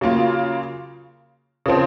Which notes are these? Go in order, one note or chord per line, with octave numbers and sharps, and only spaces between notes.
C#3 F#3 A#3 F4
C#3 F3 C4